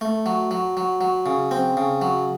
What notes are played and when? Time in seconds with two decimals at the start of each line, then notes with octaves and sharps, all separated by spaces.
0.01 A3
0.26 F#3
0.51 F#3
0.77 F#3
1.01 F#3
1.26 C#3
1.51 C4
1.77 C#3
2.02 F#3